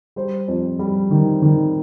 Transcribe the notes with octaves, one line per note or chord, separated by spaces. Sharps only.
G3 C5
F2
G3
D#3
D#3